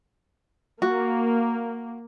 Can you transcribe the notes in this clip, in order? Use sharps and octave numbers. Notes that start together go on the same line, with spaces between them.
A#3 F#4